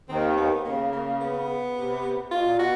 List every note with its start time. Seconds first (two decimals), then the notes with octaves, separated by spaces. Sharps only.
0.09 D#2 D#3 C4
0.37 B3
0.65 C#3 A#3
0.93 A#3
1.20 B3
1.76 C3
2.31 B2 F4
2.43 A#2
2.55 B2 F#4